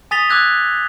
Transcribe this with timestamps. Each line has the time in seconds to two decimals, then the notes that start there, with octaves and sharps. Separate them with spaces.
0.11 G#5 D#6 A6 B6 F7 G7
0.30 D6 E6 F#6 G#6